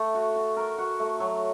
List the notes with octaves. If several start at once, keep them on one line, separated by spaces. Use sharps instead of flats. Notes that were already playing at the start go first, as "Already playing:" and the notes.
Already playing: A3
F#4
F#4
A#4
F#4
A3
F#3